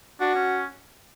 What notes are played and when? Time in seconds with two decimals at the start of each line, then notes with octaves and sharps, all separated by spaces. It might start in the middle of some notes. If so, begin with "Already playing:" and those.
0.21 D4 F#4
0.35 C#4